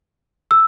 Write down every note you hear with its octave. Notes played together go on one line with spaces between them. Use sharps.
E6